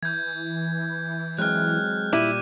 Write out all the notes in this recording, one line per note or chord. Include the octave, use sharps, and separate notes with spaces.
E3 G6 G#6
F#3 G#3 C4 F6 F#6
A#2 G3 E4 D6 D#7